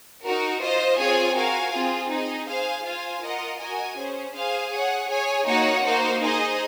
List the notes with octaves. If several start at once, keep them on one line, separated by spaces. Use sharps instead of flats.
D#4 F#4 A#4
F4 C5 D#5
C4 F4 G#4 C#5 G#5
F#4 A#4 F5 G#5
C4 F4 G#4
D#4 G#4 D#5
G#4 C5 F5 G#5
F4 C5 F5 G#5
F4 A#4 D#5 F#5
F#4 A#4 D#5 G#5
C#4 G#4 C5
G#4 C5 F5 G#5
G#4 C#5 F#5
G#4 C#5 G#5
A#3 D#4 F#4 C#5 F#5
A#3 D#4 F#4 C5
D#4 G#4 C5 D#5